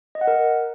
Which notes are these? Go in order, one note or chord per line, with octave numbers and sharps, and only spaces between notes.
D#5
F#5
A#4